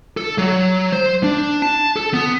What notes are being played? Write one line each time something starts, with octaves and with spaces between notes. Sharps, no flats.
A4
F#3
C5
D4
A5
A4
B3